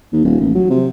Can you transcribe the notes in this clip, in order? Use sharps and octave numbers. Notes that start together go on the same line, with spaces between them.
D#2
D#1
A1
F#3
C3